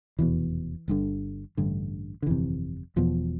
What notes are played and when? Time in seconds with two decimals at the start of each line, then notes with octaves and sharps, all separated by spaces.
0.18 F1 E2 B2 E3
0.88 G1 G2 D3
1.57 A1 G2 D3
2.22 D3
2.26 G1 F2 C3 E3
2.96 E1 E2 B2 F3